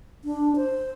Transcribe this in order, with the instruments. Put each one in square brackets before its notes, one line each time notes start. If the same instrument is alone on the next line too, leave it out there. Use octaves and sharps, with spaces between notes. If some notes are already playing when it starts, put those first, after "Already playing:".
[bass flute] D4
C5